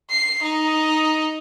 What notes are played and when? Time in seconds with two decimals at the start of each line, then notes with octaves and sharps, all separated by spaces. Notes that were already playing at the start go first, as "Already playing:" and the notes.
0.10 C7
0.43 D#4